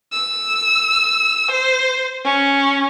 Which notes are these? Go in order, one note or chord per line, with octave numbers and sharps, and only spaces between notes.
E6
C5
C#4